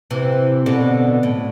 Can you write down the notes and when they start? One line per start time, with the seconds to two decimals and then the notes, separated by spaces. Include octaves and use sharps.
0.11 C3 E3
0.66 B2 D3
1.23 A2